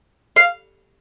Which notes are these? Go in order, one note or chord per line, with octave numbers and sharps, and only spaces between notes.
F5